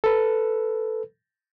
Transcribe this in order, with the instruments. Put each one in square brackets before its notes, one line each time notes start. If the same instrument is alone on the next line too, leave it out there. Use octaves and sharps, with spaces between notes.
[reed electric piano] A4 B4